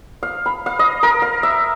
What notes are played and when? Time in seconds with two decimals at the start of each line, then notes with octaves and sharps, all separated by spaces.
0.23 F5
0.46 B5
0.66 F5
0.79 D#5
1.03 A#4
1.22 F5
1.43 E5